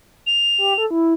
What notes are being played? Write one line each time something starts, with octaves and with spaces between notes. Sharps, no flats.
F7
G4
A4
E4